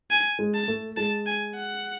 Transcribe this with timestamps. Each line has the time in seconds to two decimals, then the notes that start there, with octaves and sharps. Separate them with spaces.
0.10 G#5
0.39 G#3
0.54 A5
0.68 A3
0.97 G#3 A5
1.26 G#5
1.55 F#5